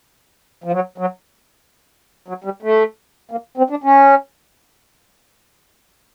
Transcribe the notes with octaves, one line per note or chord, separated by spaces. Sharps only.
F3
F#3
F#3
F#3
G3
A3
A#3
C4
D4
C#4